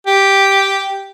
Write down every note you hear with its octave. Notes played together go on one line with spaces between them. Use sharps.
G4